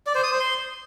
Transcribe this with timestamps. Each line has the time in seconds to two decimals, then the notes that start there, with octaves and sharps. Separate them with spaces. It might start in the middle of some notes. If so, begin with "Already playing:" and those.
0.07 D5
0.15 C5
0.23 D#6
0.31 C5
0.39 C6